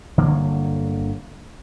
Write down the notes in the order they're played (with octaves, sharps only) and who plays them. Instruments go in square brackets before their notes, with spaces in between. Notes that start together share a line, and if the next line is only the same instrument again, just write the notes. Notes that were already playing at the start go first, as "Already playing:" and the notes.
[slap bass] G1 D3 F#3 A#3